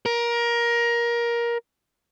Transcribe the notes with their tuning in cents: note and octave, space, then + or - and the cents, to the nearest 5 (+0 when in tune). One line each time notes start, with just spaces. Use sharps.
A#4 +20